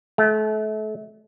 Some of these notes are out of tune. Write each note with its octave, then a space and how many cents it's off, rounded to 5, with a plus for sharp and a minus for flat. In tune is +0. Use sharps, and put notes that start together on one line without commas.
A3 -35